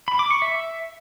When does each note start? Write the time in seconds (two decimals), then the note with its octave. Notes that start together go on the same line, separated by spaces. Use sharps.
0.08 B5
0.19 D6
0.31 C#6
0.42 E5